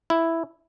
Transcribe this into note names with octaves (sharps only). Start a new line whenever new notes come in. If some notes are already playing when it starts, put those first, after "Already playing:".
E4